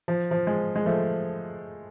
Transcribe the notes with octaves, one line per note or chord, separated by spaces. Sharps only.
F3
F3
G#3
G#3
F3 A3